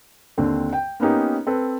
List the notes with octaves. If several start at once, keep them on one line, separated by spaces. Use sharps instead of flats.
D#2 D3 C4
G5
A#3 B3 C#4 D#4 G4
C4 A4 B4